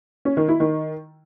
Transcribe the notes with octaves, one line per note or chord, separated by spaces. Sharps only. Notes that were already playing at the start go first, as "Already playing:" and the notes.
C#4
D#3
E4
D#3